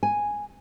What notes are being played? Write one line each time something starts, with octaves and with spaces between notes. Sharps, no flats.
G#5